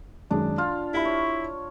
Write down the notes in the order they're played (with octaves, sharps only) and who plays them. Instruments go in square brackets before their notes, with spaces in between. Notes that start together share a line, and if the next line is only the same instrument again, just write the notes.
[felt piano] F#2 D#3 G#3 [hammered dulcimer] D4
[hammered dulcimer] F4 [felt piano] F6
[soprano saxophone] E4 [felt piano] G4 E5 B5
[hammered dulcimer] C#5